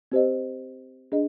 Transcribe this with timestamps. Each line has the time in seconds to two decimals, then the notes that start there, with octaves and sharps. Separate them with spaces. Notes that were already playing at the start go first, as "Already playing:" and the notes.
0.12 C4 G4 C5 D#5
1.12 D4 G#4 D#5